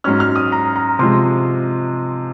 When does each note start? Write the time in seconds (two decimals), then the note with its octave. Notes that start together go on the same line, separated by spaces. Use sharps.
0.04 G#2 F#3 C#4 F6
0.20 F6
0.36 D#6
0.52 A#5
0.76 A#5
0.99 C3 F3 G#3 C6